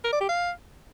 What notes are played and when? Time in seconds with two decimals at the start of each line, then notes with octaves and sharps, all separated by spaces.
0.04 A#4
0.12 D5
0.21 G4
0.29 F5